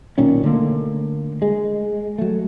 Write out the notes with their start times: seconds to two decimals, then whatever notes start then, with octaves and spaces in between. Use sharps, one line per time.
0.18 B1 A#2 D#3 C#4
0.43 D3 A3 A#3
1.42 G#3
2.18 F#3 A3